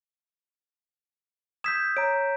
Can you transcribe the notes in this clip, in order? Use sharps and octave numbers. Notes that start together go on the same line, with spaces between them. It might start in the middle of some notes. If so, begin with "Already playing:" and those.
D#6 E6 G6 G#6 B6 E7
C#5 A#5 D7